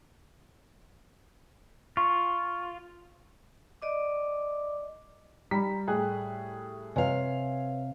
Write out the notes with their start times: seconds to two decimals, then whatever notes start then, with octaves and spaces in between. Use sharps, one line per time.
1.97 F4 C#6
3.82 D5 D#5 D6
5.51 G3 A#5 B5 B6
5.88 A2 G#4 G5 F#6
6.96 C3 B4 C#5 D#5 F5 G#5